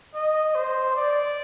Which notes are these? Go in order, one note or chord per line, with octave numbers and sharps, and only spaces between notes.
D#5
C5
D5